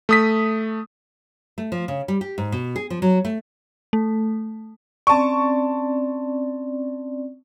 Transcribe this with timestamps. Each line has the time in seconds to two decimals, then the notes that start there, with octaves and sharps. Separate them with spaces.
0.09 A3 D#6 B6
1.58 A3
1.72 F3
1.88 C#3
2.08 G3
2.21 G4
2.38 G#2
2.52 B2
2.76 G#4
2.90 F3
3.02 F#3
3.25 A3
3.93 A3
5.07 C4 C#4 D5 A5 C#6